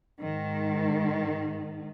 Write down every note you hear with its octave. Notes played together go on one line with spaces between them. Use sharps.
G#2 D#3